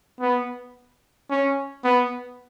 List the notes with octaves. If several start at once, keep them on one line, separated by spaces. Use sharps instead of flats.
B3
C#4
B3